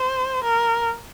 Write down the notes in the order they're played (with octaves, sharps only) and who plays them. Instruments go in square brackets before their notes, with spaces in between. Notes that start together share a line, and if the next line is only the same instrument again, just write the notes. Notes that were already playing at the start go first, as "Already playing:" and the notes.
Already playing: [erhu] C5
A#4